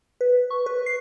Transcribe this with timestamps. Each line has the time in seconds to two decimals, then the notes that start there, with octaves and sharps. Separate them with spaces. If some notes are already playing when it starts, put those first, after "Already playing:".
0.21 B4
0.50 C#6
0.66 B4
0.86 C7